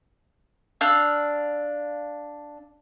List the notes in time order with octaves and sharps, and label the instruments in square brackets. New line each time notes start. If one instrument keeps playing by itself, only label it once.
[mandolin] D4 F5 E6 G6